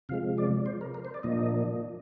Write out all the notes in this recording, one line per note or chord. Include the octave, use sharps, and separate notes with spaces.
C3 F3 G#3 F5
D5
C5
A#4
A#4
C5
D5
A#2 F3 A#3 D4 D#5